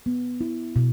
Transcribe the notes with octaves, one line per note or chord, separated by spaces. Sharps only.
B3
E4
B2